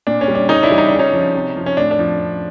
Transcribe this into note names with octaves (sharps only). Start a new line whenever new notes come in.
A#2 D4
C#4
G3
D4
C#3 C#4 D#4
D4 E4
E3 G3
D#4
C#3 D4
C#4 D#4
F3
C3
F3
C#4
A2 D4
D4
F3